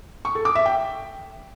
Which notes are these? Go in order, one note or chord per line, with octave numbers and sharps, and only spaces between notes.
C#6
A4
D6
E5
G5